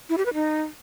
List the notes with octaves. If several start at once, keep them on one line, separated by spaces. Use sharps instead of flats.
E4
G4
B4
D#4